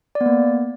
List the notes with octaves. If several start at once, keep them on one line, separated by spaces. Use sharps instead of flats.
D5
B3
A#3